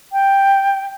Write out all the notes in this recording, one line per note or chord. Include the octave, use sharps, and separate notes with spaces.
G5